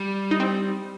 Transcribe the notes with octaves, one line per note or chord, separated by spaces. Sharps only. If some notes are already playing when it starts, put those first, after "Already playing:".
Already playing: G3
D#4
C4